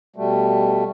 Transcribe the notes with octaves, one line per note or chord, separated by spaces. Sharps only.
B2 G3 A3